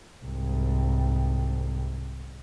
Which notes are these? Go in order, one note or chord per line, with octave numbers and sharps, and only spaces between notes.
C2 G#2